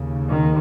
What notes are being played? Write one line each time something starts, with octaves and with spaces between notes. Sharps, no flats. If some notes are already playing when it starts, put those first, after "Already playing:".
Already playing: D#2 C#3
D#3